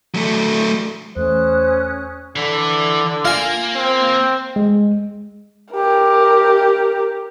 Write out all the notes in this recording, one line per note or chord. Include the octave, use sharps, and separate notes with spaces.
F#3 A3
E2 A3 C#4 C5 D#6 F#6
D3 E3
A#3 F4 G#5
C4
G#3
G4 A#4